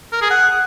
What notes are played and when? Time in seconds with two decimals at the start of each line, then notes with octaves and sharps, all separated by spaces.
0.12 A#4
0.21 G#4
0.30 F#5